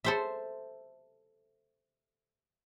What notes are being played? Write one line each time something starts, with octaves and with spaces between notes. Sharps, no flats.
A4 C5 E5